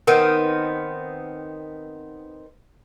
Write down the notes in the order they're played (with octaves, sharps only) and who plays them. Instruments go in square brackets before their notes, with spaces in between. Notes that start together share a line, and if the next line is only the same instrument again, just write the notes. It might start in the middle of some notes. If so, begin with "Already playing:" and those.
[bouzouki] D#3 B3 C4 [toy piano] A#4